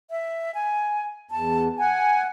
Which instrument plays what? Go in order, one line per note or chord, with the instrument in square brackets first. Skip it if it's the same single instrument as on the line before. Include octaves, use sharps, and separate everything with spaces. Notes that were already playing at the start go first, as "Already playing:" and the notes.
[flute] E5
G#5
[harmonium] E2 [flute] A5
[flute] F#5 [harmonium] G#5